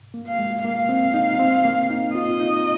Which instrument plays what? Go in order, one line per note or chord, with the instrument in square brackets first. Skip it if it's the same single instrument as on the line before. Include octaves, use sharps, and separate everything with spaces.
[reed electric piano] A#3
[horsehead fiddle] F5
[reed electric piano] G#3
[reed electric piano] A#3 [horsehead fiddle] F5
[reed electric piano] C4
D#4
C4
A#3
D#4
[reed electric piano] F4 [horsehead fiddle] D#5
[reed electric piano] D#4